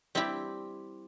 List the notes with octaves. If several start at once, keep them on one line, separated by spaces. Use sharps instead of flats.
G3 C4 E4 G4